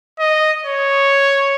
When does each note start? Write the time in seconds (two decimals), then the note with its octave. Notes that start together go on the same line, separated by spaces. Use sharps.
0.19 D#5
0.66 C#5